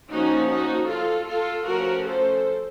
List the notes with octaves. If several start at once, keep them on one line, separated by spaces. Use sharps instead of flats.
F3 A#3 C#4 D#4 F#4
D#4 F#4
F4 A4
F4 A4
F3 A3 C#4 F#4 A#4
A4 C5